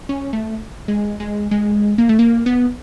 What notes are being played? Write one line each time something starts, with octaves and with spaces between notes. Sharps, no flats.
C#4
A3
G#3
G#3
G#3
A#3
A3
A#3
B3